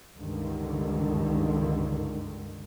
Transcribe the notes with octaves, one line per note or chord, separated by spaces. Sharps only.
C#2 G2 D3 D#3